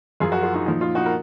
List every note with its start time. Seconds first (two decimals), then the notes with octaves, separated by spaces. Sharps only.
0.20 F#2 F3 F4 G#4
0.32 F#4 A#4
0.43 F4 G#4
0.54 D#4 F#4
0.66 A#2 F3 D#4
0.81 F4
0.95 D#4 F#4
1.06 A#4